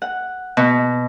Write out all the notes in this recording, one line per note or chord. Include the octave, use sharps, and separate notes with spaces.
F#5
B2